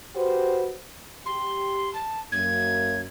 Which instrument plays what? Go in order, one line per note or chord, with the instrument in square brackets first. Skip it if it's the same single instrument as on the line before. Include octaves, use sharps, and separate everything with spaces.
[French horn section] F#4 G4 B4 C5
[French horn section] G4 [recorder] C6
[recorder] A5
[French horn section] F#2 A#3 [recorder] G#6